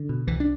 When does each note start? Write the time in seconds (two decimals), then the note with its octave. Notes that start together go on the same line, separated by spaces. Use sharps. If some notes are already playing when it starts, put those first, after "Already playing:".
Already playing: D3
0.09 B2
0.27 C2 E3
0.40 D4